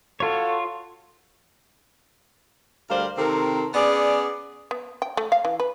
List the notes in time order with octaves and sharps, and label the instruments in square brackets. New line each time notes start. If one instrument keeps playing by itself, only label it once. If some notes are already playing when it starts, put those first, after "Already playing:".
[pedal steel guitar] F4 C#5 [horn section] F#4 A4
[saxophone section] D2 G3 A#4 C5 D5 F5
C3 D#3 C4 A4 A#4
B3 C#4 G#4 D5
[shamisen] B3
G5
A3
F5
E3
B4